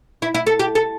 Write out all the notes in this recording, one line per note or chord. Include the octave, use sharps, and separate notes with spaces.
E4
E4
A4
G4
A4